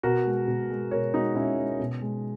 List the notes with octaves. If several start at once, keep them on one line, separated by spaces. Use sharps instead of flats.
B2 F#4 A#4
G#3
B2
G#3
B2 A#4 C#5
G#3 D#4 F#4
B2 C#4 E4
G#3
B2
G#3